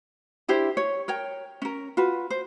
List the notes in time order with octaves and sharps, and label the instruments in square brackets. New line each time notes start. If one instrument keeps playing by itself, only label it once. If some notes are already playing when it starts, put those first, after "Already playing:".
[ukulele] D4 E4 G4 C5
C#5
A#4 C#5 G5
C#4 A#4
F4 F#4 B4
C5